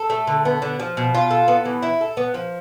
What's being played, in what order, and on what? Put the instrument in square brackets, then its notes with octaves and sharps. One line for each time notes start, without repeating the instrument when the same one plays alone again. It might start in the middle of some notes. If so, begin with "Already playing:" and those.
Already playing: [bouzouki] A4
A3
D3
B3
D3
F3
B2
F4
A4
B3
E3
E4
A4
B3
F3